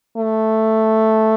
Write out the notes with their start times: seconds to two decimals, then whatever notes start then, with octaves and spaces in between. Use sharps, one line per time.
0.17 A3